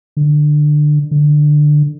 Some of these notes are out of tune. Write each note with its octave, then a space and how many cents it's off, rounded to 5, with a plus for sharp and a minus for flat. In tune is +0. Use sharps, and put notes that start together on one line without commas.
D3 +20
D3 +15